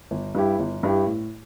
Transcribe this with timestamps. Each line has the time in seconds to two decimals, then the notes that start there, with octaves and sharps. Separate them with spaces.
0.11 G1
0.35 G2 G3 E4 G4
0.59 G1
0.83 G2 G3 E4 G4
1.07 A2